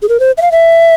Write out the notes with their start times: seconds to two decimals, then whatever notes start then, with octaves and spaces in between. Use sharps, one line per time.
0.02 G#4
0.09 A#4
0.20 C5
0.37 E5
0.42 F5
0.52 E5